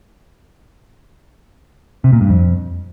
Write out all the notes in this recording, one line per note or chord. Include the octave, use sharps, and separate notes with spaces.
C3
A#2
G2
F2